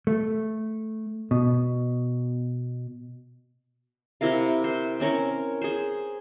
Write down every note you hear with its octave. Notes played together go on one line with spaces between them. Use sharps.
A3
B2
C3 E4 A#4 F5
C5
C4 C#4 A#4 C#5
G#4 C5